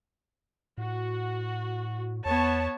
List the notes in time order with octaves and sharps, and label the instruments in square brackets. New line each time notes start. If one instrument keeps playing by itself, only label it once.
[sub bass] A2 [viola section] F#4
[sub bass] E2 [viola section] B3 C#5 A5